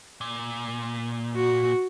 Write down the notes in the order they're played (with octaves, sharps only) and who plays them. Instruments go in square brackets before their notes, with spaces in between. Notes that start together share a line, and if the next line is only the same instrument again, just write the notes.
[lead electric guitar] A#2
[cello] F#4